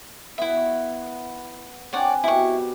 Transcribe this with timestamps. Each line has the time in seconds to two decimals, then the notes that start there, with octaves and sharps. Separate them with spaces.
0.38 B3 E4 E5 F#5
0.57 C#6
1.93 C4 D4 C#5 D5 F#5 G#5
2.24 B2 E4 G4 C#6